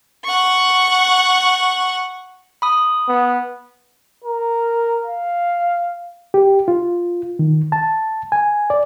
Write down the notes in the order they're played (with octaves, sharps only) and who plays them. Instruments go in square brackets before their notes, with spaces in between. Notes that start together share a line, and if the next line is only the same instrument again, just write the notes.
[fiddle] F#5 C#6
[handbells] B5 D#6
[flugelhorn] B3
A#4
F5
[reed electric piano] G4
F4
D#3
A5
G#5
D5